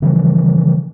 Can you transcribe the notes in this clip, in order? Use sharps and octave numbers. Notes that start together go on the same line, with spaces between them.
C#3 E3 F3 G3